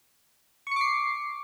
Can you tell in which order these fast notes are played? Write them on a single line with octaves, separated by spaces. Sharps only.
C#6 C#7 D6 C7